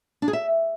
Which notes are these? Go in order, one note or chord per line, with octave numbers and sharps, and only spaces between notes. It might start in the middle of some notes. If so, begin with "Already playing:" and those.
D4
G#4
E5